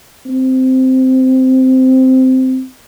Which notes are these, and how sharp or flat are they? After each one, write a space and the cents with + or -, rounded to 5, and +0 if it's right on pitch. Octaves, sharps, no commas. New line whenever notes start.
C4 -10